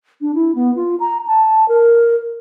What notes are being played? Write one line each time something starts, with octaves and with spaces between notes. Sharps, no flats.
D4
E4
B3
F4
A#5
A5
A#4